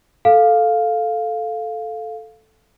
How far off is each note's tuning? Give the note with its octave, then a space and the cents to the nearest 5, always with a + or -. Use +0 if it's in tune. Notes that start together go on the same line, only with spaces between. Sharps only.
A4 -5 F5 +5